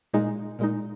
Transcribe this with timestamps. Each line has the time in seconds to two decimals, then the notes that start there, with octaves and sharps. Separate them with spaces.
0.13 A#2 G#3 D#4
0.59 A#2 G#3 D#4